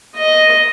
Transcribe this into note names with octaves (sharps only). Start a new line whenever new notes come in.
D#5